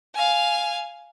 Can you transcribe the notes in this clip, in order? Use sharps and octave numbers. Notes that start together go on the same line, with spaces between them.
F5 G#5